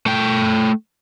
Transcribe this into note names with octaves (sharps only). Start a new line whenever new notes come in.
A3 G5